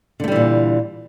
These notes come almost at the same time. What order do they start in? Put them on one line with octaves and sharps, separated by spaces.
D3 A3 G3 E3 A#2